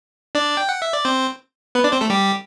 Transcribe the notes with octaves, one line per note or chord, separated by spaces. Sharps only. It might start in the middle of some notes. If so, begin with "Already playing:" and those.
D4 D5
G5
F#5
E5
D5
C4 C5
B3 B4
D4 D5
C4 C5
A3 A4
G3 G4